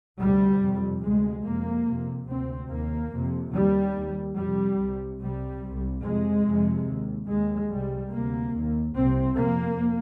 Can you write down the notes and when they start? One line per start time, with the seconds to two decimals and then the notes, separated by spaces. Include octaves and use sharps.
0.19 D2 C3 G3
0.61 F2 C3
1.02 D2 C3 G#3
1.44 F2 C3 A#3
1.86 F2 C3
2.27 D2 C3 C4
2.69 D#2 A#3
3.11 F2 C3
3.52 D#2 G3
3.94 D#2
4.36 F2 C3 G3
4.78 C2 C3
5.19 C2 C3 G3
5.61 C2 C3
6.03 F2 C3 G#3
6.44 F2 C3
6.86 D#2
7.27 D#2 G#3
7.69 C2 C3 G3
8.11 D2 C3 A#3
8.53 D#2
8.94 C2 C3 C4
9.36 F2 C3 A#3